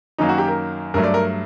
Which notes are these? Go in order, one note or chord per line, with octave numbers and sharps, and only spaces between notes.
F#2 D#3 F#3 A#3 D#4
F#4
G4
A#4
G2 F#3 A3 A#4
D5
A#4